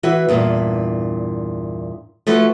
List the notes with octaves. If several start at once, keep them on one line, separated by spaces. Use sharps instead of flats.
E3 F#4 B4 E5
E2 G2 A#2
F3 A3 E4 F#4 B4